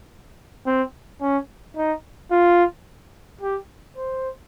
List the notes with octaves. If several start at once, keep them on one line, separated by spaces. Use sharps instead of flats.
C4
C#4
D#4
F4
G4
C5